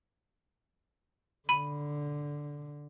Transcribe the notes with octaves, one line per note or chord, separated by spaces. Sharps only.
D3 B5 D#7